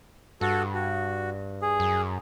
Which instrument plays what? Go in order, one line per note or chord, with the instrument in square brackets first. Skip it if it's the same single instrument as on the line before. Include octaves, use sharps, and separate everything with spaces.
[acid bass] G2 [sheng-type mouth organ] F#4 A4
[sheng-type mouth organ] F#4
G#4
[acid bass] F#2